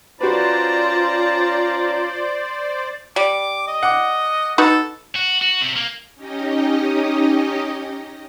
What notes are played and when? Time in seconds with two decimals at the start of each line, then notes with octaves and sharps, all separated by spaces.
0.21 C#4 F4 F#4 B4 C5 D5 A5 A#5
3.16 G3 D6
3.67 D#5
3.83 F#5 D6
4.58 D#4 F#4 A4 B4
5.16 F#4
5.42 F#4
5.61 C3
5.76 A#3
6.15 C#4 D#4 G4 D#5